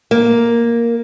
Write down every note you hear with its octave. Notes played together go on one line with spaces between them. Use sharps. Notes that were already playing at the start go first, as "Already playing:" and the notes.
A#3